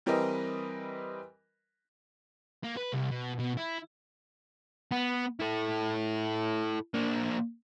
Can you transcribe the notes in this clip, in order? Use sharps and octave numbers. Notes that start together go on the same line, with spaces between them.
E3 G3 C4 A#4 B4 D#5
A#3
B4
C2
B2
B2
E4
B3
E4 A4
A#3 D4